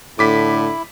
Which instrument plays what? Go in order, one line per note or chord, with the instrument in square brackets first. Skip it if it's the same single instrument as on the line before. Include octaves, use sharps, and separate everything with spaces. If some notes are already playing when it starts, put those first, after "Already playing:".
[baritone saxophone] A2 [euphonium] D3 [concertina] E4 [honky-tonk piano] D6 B6